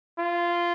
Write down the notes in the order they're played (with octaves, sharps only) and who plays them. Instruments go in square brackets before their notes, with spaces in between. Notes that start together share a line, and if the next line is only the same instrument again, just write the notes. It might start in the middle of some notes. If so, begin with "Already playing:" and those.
[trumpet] F4